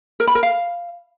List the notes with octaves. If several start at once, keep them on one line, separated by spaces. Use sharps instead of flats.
A#4
B5
A#4
F5